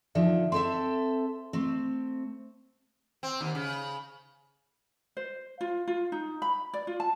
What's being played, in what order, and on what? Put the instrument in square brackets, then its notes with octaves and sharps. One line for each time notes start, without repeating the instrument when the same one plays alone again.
[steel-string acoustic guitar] D3 F3 [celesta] D#4 D5 E5
[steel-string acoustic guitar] C4 A4 E5 [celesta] C6
[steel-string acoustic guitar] A3 C4
[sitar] C4
D#2
C#3
[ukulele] C5
F4
F4
D#4
B5
D5
F4
A5